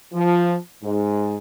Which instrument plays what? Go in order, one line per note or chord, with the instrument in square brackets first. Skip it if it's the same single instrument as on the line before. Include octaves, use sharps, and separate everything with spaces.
[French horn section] F3
G#2